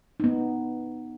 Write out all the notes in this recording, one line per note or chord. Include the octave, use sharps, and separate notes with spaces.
B3 D#4